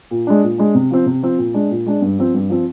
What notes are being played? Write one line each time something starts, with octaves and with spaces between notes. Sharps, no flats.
A#2
G#3 D4
A#2
G#3 D4
C3
F3 C4
C3
F3 C4
A#2
G#3 D4
A#2
G#3 D4
G2
F3 C4
G2
F3 C4